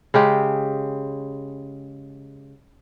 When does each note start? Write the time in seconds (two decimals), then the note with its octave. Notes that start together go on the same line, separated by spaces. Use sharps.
0.14 C#3 G#3 G4